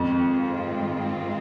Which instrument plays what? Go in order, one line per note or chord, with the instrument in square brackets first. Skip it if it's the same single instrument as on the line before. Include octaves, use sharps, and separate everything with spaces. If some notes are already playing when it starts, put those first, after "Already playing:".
Already playing: [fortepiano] F2 [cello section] G#2 D#3 G#3 C4 F4